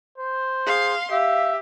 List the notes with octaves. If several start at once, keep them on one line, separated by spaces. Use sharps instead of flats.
C5
G#4 F5 C6
G4 E5 F5